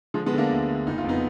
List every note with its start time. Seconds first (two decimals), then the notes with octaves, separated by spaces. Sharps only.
0.14 D3 F3 G#3
0.26 G#3 B3
0.33 D3
0.38 A#3 D4
0.50 D2
0.68 D2
0.86 F#1 D#4
0.98 F4
1.04 F2 B3 D#4